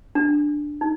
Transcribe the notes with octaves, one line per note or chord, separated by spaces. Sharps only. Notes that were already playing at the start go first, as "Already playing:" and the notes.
D4
D#4